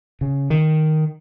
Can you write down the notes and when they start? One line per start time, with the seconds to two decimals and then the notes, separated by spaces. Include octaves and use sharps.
0.21 C#3
0.50 D#3